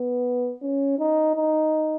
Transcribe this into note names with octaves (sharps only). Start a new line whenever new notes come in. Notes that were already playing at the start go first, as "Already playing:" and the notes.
Already playing: B3
C#4
D#4
D#4